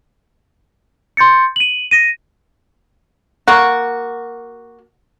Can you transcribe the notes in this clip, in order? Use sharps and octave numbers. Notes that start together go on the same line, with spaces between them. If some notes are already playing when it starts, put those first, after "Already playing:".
C6 G6 A6 C#7
D#7 F#7
A#6 D#7
A#3 F#4